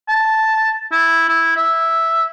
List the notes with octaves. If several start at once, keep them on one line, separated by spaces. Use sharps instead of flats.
A5
E4
E4
E5